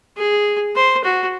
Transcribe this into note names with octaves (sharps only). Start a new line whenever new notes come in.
G#4
C5
F#4